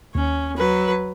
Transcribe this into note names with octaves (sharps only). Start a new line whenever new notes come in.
D#2 C#4
F#3 B4